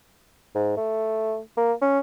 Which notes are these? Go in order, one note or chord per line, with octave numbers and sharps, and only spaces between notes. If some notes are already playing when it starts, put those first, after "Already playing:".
G#2
A3
A#3
C#4